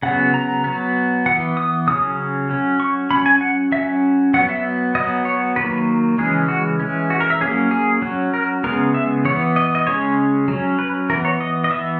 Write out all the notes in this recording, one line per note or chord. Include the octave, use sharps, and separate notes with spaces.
C#3 F#3 B3 F#5
A#5
F#3 B3
E3 B3 F#5
D#6
C#3 F#3 C#4 D#6
F#3 C#4
C#6
F#3 C#4 B5
G#5
F#5
F#3 C#4 E5
F#3 B3 F#5
E5
F#3 B3 D#5
C#5
D#3 F#3 A#3 B4
C#3 E3 G#3 C#4 G#4
F#4
E3 G#3 C#4
F#4
A#4
E5
F#3 A#3 C#4 G#4
G#4
F#3 C#4
A#4
C#3 G#3 B3 A#4
E5
E3 B3 C#5
D#5
D#5
C#3 G#3 C#4 C#5
F#3 C#4
B4
E3 B3 A#4
C#5
D#5
D#5
E3 B3 E5